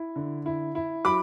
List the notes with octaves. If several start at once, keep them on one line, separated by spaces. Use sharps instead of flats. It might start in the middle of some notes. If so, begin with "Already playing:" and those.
Already playing: E4
D3
E4
E4
F#3 B5 D6